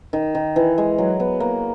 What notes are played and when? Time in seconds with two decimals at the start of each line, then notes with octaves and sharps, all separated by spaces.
0.13 D#3
0.35 D#3
0.56 E3
0.78 G#3
0.98 F#3
1.20 B3
1.40 A#3